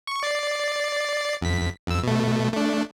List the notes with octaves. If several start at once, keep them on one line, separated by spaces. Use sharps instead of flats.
C#6
D5 A6 C7
F2 B6
F2 E6
B2 A3
A3 D4